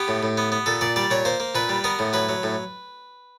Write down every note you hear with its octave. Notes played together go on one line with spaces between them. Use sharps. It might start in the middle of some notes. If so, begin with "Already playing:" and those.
Already playing: B3 G4
A2
A2
B3
B3
A#2 A4
A#2 D5
G3 D5
A#2 C#5
A#3 C5
A#3
A#2 B4
G3
B3 A#4
A2
F#3 B4
F#3
A2